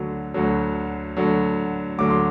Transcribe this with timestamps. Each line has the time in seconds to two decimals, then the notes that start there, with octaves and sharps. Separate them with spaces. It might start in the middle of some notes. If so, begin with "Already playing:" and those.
Already playing: D2 D3 F#3
0.34 D2 D3 F#3
1.17 D2 D3 F#3
1.98 D2 D3 F#3 D6
2.10 C6